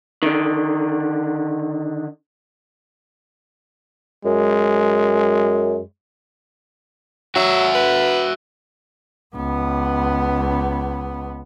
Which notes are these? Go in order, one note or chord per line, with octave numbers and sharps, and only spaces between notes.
D3 D#3
F#2 G#3
F#3 F#4 E5
B4
C#2 B3